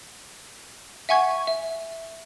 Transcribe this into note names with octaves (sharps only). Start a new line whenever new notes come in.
E5 F#5 G#5 C#6 G#6
E5